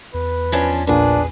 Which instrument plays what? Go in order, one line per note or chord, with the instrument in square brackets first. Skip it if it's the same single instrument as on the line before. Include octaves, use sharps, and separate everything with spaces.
[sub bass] E2 [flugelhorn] B4
[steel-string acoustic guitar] F3 C#4 D4
[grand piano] A#1 A#3 F4 [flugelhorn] D4 [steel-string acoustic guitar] G#4 B4